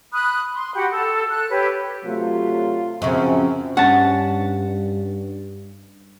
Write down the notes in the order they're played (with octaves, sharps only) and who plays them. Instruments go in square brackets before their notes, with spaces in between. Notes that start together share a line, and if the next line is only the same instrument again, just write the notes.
[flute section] B5 D#6 F#6
C6
F#4 G4 F#5 B5
A4
A4 F#6
G4 B4 C#5
[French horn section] C3 F#3 A3 [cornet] F4
[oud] F#2 C#3 [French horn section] F3 C4
[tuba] G2 [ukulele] C#4 [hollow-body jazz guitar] F#5 A5